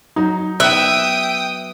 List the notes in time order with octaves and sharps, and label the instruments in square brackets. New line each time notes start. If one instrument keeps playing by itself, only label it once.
[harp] F#3 [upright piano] D#4
[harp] B3 [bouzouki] E5 [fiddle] G5 D#6 [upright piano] F#6